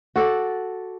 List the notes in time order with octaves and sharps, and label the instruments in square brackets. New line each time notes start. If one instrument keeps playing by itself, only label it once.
[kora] F#4 A4 D5 F#5